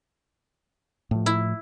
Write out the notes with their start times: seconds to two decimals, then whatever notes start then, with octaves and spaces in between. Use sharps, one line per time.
1.11 A2 F3
1.26 E4